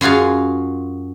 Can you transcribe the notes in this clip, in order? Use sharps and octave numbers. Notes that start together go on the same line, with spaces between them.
F#2 F4 F#4 G#4 F5